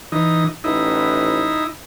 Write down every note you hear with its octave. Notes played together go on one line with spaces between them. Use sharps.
E3 D#4
A1 D#4 E4